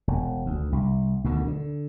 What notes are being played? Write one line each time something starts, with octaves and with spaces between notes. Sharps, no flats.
E1
D2
C2
D2 B2 D3 D#3
D3